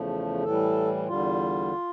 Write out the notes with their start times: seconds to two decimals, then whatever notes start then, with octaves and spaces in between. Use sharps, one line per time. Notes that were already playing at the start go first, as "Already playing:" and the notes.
Already playing: E2 C#3 F3 A3
0.43 A2 E3 G3 A4
1.08 E2 D3 G3 F4